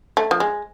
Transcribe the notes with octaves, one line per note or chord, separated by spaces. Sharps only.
A3
F3
G#3